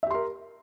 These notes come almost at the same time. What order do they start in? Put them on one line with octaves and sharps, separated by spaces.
E5 G4 C6 A#4